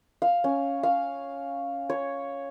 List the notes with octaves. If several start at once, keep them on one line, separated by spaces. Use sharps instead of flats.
F5
C#4
F5
C#5